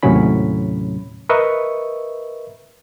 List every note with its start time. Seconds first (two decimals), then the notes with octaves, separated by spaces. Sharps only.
0.03 D#2 A2 C3 F#3 C#4 B5
1.29 A#4 B4 D#5 E5 C#6